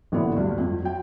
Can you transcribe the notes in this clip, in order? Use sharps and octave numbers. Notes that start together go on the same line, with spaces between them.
A1 D3 A#3 B3 E4
D2 G2 A#2
F2
F#3 G5